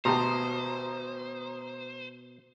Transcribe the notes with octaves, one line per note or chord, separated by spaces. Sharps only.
G#1 D2 B2 G4 C5 A#5 C6 D#6